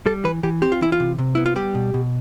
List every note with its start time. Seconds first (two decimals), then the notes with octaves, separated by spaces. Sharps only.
0.06 G3 A4
0.24 E3 B4
0.43 E3 G4
0.62 C4 G4
0.72 F4
0.81 E3 E4
0.92 F4
1.00 C3
1.18 C3
1.35 B3 E4
1.46 F4
1.56 G3 G4
1.75 B2
1.94 B2